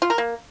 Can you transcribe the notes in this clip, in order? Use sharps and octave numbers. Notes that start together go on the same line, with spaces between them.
F4
A#4
A#3